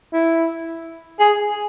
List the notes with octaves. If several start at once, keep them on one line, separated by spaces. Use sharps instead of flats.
E4
G#4